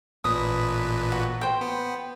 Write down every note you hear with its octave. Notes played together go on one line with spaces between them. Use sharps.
A1 A#2 B4 D#6
F#4
C5 G5
B3